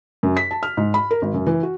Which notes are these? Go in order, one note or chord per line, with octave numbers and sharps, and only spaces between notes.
F#2
B6
A5
F6
G#2
B5
A#4
G#1
F#2
E3
F#4